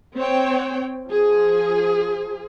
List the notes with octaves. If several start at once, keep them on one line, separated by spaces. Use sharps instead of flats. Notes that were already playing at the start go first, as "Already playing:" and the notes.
C4 C#5 G5
F3 G#4